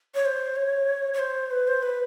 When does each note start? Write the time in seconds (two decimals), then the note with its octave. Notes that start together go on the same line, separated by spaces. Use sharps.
0.15 C#5
0.26 C5
0.56 C#5
1.14 C#5
1.19 C5
1.51 B4
1.68 C5
1.83 B4